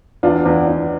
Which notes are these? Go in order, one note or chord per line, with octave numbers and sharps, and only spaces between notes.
E2 D4 F4
E2
E2